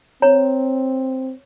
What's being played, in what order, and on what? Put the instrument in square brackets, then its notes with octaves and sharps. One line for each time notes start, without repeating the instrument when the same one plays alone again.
[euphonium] C4 [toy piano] C#5 A#5